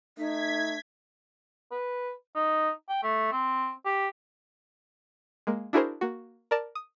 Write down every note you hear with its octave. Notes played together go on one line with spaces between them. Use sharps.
A3 D#4 G#6 B6
B4
D#4
G5
A3
C4
G4
G#3 A#3
D4 E4 F#4 G#4 A#4 C5
A#3 F#4
A#4 D5 A5
D#6